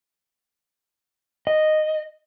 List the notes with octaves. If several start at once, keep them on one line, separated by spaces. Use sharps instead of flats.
D#5